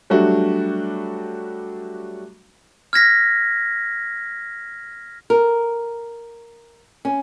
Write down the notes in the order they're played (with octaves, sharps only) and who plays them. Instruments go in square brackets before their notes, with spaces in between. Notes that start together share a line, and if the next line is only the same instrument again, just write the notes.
[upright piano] F#3 G3 A3 D4 F#4
[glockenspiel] F6 G#6 A#6 B6
[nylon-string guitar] A#4
C#4